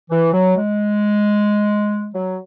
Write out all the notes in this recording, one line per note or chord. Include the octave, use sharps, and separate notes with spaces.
E3
F#3
G#3
F#3